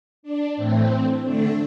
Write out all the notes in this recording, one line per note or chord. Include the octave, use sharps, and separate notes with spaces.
D4
A2 E3 A3 C4
D3 A3 D4